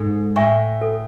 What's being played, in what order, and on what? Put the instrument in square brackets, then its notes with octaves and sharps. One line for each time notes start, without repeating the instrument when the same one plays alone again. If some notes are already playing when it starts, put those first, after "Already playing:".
Already playing: [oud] G#2 [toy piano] A4
[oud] A2 [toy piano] E5 G#5 C#6
[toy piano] A4